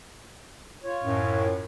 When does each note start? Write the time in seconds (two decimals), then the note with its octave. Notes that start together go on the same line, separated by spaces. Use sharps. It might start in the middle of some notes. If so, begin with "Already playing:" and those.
0.84 F4 C#5
1.03 F#2 A2